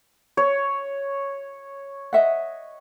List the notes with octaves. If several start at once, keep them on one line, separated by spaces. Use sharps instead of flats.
C#5
D#5 E5 F#5